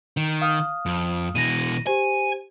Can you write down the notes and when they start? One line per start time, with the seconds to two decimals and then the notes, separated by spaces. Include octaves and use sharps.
0.17 D#3
0.41 F5 D#6 F6
0.86 F2
1.35 B2 E3 A#6 D#7
1.87 G4 C5 G#5